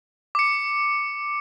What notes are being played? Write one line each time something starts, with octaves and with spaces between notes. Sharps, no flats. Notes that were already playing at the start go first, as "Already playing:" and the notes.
D6 C#7